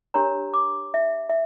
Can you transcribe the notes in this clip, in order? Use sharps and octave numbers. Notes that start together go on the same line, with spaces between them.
D4 G4 A#4 C#5 A#5
D6
E5
E5